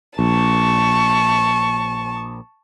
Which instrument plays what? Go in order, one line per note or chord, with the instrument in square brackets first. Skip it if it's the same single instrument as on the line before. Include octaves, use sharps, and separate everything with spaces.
[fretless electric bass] A#1 [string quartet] A5 C#6